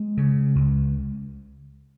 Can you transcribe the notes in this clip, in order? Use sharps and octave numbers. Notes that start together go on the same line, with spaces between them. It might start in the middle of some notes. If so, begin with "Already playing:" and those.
Already playing: G#3
C#3
C#2